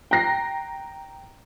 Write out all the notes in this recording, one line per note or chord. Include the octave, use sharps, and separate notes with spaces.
G5 A#5 F#6 A#6 C7